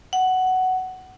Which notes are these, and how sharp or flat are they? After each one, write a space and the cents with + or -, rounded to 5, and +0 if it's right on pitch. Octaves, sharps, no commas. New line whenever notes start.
F#5 +10